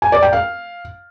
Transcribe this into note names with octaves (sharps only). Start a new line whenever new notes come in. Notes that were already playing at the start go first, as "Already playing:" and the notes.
G#5
D5
G5
F5